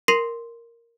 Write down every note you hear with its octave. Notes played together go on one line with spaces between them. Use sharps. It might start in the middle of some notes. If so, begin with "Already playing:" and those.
A#4 C6 A#6 C7 D#7 F#7